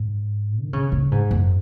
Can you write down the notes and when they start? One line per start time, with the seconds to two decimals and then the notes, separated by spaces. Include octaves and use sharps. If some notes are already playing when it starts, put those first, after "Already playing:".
Already playing: G#2
0.62 D#3
0.73 C#3
0.92 C#3
1.11 G#2
1.31 F#2